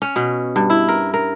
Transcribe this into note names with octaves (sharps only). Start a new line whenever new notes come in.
C#4
B2
G2
E4
A#4
A#4